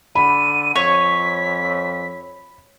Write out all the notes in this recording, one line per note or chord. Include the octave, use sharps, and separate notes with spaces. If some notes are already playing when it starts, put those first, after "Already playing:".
D3 B5 D#7
F2 C#5 B6